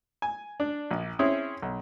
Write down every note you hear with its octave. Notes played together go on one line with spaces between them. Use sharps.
G#5
D4
A#1
C4 C#4 E4 G#4
B1